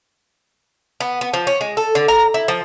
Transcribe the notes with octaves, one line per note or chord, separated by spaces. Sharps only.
B3
B3
F3
C#4
G#3
A4
D3
A#5
E4
F3